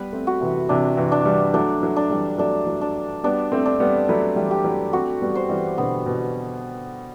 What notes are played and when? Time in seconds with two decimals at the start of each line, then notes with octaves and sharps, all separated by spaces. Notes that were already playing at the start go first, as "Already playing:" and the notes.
Already playing: G3 B3 B4
0.13 A3 C4
0.27 F#4
0.41 C3 E3
0.69 C3 E3 D4
0.97 C3 E3
1.12 D4
1.25 E3 G3
1.54 F#3 A3 D4
1.82 F#3 A3
1.96 D4
2.10 E3 G3
2.38 F#3 A3 D4
2.67 F#3 A3
2.81 D4
3.24 G3 B3 D4
3.52 A3 C4
3.65 D4
3.80 G3 B3
4.09 F#3 A3 B4
4.36 E3 G3
4.51 G4
4.65 F#3 A3
4.93 A3 C4 F#4
5.21 G3 B3
5.35 C5
5.49 E3 G3
5.78 B2 D3 B3
6.06 B2